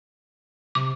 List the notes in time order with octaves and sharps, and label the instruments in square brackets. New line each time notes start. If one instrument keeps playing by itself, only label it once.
[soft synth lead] C3 [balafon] D6